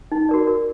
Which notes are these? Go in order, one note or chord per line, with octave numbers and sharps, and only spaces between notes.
D#4
F#4 A#4 D5
A#4